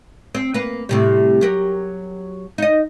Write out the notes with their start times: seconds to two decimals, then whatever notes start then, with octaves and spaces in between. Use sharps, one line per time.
0.35 C4
0.54 A#3 B4
0.89 A2 C3 G3
1.41 F#3 G4 A#4
2.58 D#4 D#5